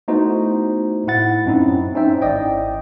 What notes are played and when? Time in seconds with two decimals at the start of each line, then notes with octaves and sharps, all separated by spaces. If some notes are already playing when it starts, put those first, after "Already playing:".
0.08 A3 B3 D#4 E4 F#4 C5
1.07 A2 E4 F#5 A6
1.45 F#2 C4 C#4 D#4 E4
1.95 C#4 D#4 C5 E5 G5
2.22 G#1 E4 D5 D#5 G5